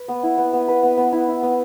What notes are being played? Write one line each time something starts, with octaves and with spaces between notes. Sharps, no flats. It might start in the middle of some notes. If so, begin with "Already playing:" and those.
Already playing: B4
B3
E4
B3
B3
B4
B3
B3
E4
E4
B3